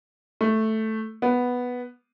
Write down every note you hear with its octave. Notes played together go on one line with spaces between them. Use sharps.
A3
B3